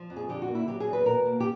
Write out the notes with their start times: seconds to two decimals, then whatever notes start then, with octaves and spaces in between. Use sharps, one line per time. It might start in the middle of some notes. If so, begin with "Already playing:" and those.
Already playing: F3
0.10 F2
0.16 G#4
0.29 D3 G4
0.42 F#4
0.48 A#3
0.55 E4
0.68 F#3 G4
0.80 G#4
0.87 E2
0.93 B4
1.06 B2 A#4
1.25 A#3
1.40 G4